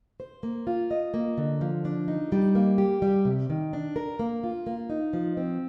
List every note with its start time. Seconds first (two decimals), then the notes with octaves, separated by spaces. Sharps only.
0.20 C5
0.43 A#3
0.67 F4
0.91 D#5
1.14 A#3
1.38 D3
1.61 F3
1.85 D4
2.08 D#4
2.32 G3
2.55 A#3
2.78 G4
3.02 G3
3.25 C3
3.50 D#3
3.73 D4
3.96 A#4
4.19 A#3
4.44 F4
4.67 A#3
4.90 D#4
5.13 F3
5.37 C4